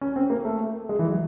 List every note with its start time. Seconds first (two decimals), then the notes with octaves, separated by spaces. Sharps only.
0.01 C#4
0.16 C4
0.30 A#3
0.45 A3
0.89 G#3
0.99 E3
1.09 F#3